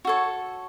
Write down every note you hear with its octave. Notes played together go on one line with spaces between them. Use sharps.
F#4 A4 C#5